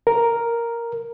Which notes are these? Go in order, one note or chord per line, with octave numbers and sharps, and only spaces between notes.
A#4